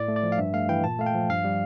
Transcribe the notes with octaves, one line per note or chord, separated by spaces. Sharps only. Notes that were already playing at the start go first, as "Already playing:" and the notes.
Already playing: A2 D5
A3
D5
F3
F5
G2 E5
A3 F5
E3 G5
A#2 A5
A3 F5
G5
F3
G2 F5
G3